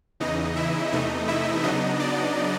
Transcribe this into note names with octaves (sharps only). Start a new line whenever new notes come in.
E2 C#3 E3 D#4 D#5
E4 E5
E2 C3 E3 A3 D#4 D#5
E4 E5
C#3 F#3 B3 D4 D#4 D#5
D4 D5